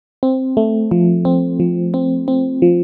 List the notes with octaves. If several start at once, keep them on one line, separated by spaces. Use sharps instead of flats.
C4
A3
F3
C4
F3
C4
C4
F3